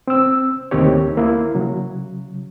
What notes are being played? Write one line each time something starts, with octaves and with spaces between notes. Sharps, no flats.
C4 E6
D2 D#3 A#3 C4 G4 C#5
A#3 E4
C#3 F#3